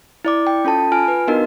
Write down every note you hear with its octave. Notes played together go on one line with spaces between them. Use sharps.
E4 D5 D6
G5
C#4 F4 A4 A5
F4 G#5 F6 D7
B4
B3 D4 D#4 F#4 A#4 D#5